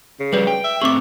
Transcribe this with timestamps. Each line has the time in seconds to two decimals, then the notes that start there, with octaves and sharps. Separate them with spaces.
0.20 C#3
0.33 G3 F#4 G4 B4 D5
0.47 G5
0.64 E5
0.82 A3 C4 G#4 C#6 D6